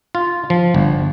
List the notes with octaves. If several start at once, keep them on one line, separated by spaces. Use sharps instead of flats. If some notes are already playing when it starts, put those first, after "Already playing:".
F4
F3
G1